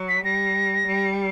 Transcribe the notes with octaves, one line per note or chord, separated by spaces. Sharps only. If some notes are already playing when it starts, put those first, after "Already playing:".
Already playing: F#3
B6
G3 A#6
G3